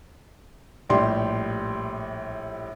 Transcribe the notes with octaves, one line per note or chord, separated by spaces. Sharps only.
A#1 A2 G3 G4 D5 C6